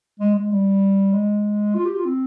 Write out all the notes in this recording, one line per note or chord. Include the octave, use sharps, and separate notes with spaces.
G#3
G#3
G3
G#3
F4
G4
F4
C4